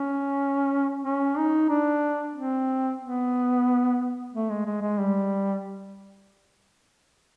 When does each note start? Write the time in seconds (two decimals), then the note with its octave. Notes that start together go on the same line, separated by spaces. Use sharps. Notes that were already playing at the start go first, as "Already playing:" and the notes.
Already playing: C#4
1.05 C#4
1.38 D#4
1.70 D4
2.35 C4
3.02 B3
4.33 A3
4.50 G#3
4.66 G#3
4.82 G#3
4.99 G3